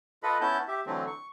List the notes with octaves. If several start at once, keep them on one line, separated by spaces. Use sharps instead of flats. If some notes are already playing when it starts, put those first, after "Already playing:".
F4 A4 B4 D#5 B5
B3 C#4 E4 A5 G6
G4 E5
D3 E3 F#3 A3 C4
C#6